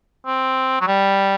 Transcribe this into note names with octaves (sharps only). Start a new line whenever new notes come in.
C4
F#3
G3